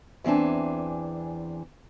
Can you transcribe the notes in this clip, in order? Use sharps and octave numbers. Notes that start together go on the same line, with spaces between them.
E2 E3 C4 D4 G#5